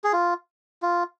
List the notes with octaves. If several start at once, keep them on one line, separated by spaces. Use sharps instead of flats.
G#4
F4
F4